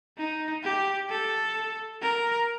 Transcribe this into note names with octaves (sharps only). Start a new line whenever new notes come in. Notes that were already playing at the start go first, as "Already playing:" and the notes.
D#4
G4
A4
A#4